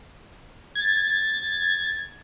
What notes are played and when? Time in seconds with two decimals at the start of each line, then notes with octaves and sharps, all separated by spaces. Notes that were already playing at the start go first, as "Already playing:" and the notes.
0.75 G#6 A6